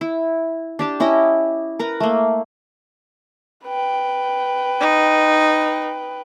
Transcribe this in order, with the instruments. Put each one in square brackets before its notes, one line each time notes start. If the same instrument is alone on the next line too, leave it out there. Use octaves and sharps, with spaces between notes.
[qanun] E4
D4 G4 A5
C#4 E4 G4 D#5
A#4 B4 A#5
A3 A#3
[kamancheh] B4 G5
[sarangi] D#4